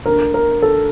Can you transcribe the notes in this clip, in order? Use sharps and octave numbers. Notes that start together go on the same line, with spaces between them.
D2 D3 A#4
A#4
A4